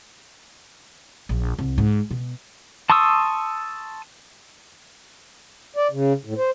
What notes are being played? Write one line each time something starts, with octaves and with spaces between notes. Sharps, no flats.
A#1
C2
G#2
B2
A5 C6 C#6 D#6 E6
D5
C#3
A2
C5